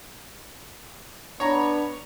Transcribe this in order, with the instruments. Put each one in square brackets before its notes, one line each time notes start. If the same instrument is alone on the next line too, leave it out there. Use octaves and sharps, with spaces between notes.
[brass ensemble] B3 D4 [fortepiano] C#5 A#5